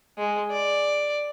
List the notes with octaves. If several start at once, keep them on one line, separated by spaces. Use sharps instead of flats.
G#3
D5